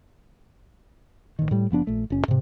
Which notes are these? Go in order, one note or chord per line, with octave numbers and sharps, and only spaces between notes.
A1 D#3
A2 G3
F#1 F3 B3 D4
A#1 A3
F#1 C#4
G#2 C3